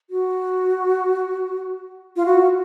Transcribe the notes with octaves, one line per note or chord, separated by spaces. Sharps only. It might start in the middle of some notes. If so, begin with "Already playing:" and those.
F#4
F4
F#4